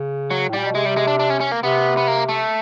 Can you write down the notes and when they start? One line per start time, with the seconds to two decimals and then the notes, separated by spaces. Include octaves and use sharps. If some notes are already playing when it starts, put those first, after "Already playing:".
Already playing: C#3
0.31 F#3
0.49 A2
0.53 A#2 G3
0.66 B2
0.75 C3 G#3
0.86 G3
0.97 G#3
1.07 D4
1.19 D4
1.30 C#4
1.41 C#4
1.52 A#3
1.63 C3 B3
1.97 B3
2.08 A#3
2.29 A3